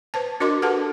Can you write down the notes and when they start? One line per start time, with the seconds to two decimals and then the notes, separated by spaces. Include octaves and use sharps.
0.14 B4 C5 A5
0.40 D4 F#4 A#4 D#5 C6 D6
0.62 G4 A4 B4 F#5 A5